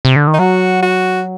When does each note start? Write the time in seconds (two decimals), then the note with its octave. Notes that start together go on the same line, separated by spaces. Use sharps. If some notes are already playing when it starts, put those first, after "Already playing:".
0.05 C3
0.16 D3
0.27 D#3
0.34 D#4
0.39 F#3 F#4
0.83 F#4